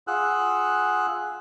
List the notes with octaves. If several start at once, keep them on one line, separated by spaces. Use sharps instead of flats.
F4 G#4 F#5 E6 F#6